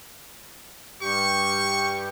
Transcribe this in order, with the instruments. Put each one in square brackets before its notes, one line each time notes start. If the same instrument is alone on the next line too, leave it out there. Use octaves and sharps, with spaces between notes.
[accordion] G2 G4 [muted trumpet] C#6